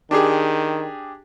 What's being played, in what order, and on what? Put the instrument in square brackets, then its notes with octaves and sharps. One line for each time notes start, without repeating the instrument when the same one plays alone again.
[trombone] D#3 [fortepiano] D4 G4 G#4